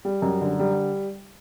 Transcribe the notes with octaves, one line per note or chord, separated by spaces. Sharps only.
G3
F#2
D3
G3